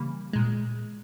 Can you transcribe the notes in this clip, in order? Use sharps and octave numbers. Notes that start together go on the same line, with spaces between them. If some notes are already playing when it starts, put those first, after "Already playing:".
Already playing: C#3 E3 G3 A#3
A#2 G#3